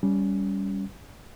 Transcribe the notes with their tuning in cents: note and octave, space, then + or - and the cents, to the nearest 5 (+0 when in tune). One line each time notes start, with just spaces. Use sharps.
G3 +0 C#4 +15